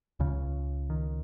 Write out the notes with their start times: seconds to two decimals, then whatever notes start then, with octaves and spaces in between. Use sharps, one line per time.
0.20 C#2 C#3
0.90 D#3